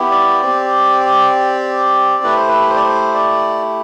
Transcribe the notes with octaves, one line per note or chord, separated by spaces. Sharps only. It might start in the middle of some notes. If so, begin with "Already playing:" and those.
Already playing: B3 E4 G4
D5
C4 G4
A3 E4 G4 B4
C5
B4
C5
D5
C5
D5